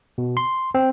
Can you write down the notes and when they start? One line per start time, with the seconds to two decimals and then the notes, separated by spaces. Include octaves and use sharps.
0.18 B2
0.37 C6
0.75 C4